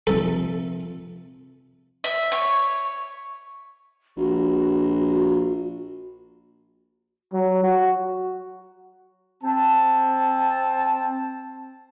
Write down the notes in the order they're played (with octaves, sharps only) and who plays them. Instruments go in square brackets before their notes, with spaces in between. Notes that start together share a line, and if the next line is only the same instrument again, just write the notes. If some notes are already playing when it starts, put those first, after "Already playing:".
[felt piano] C3 F3 [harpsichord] A4
[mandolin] E5
C#5
[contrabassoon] A#1 [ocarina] F#4
[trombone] F#3
F#4
[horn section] C4 A5